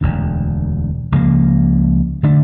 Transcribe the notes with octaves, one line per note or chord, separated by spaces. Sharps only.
E1 D2 D3
C#2 C#3 F3 A#3
D3 A3 D4